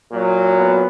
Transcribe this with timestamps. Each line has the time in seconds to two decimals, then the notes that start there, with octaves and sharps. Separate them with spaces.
0.10 A#2 F#3
0.58 B3